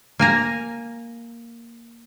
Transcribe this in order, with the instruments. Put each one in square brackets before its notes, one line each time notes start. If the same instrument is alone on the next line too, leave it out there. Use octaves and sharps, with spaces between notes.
[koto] A#3 G#5 A#5